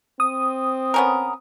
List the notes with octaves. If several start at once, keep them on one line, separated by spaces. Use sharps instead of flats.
C4 D#6
B3 C#4 A#4